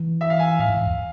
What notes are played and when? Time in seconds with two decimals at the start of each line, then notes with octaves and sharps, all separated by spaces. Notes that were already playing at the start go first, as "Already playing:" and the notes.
Already playing: E3
0.21 E5
0.30 F5
0.39 G#5
0.59 A2 F5
0.70 G#2
0.87 E2